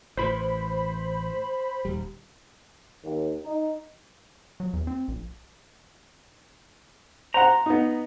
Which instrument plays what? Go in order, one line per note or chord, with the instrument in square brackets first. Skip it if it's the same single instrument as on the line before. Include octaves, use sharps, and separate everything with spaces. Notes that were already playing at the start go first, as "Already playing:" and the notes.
[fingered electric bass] A1 E3 [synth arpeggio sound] C5 B5
[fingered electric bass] D#1 G3
[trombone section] D#2
D#4
[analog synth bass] F#3
E2
C4
A#1
[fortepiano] C5 F#5 [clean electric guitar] A#5
[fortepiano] B3 D#4